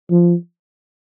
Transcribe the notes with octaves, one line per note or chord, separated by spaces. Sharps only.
F3